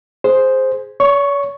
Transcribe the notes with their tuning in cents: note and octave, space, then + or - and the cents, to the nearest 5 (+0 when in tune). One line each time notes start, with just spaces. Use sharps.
G#4 +5 C5 +0
C#5 +40 C#6 +0